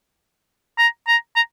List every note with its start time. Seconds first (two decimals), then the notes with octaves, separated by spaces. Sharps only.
0.78 A#5
1.07 A#5
1.36 A#5